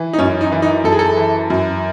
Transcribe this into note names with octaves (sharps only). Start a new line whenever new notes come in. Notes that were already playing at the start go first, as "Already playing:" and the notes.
Already playing: E3
D#4
F#2 C#4
D#4
E3
D#4
F#2 A4
G#4
A4
E3
F#2